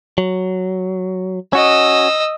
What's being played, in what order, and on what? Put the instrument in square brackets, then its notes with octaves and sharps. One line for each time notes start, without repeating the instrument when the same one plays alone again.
[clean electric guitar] F#3
[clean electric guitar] C#4 F#4 [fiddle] D#5 E6